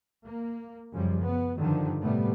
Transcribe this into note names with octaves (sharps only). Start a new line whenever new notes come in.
A#3
F#2 C#3 F3 G3
B3
G2 D3 D#3 F3
A2 C3 G3 A3 B3